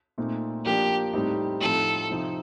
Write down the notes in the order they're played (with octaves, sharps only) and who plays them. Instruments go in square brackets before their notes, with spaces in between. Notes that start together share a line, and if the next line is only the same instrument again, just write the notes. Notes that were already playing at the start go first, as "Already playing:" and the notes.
[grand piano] A#2 A3 C4 D#4
[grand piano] F3 A#3 D4 [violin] G4
[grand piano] A2 G3 C4 D#4
[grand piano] A2 F3 C4 D#4 [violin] A4
[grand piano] C3 F3 C4 D#4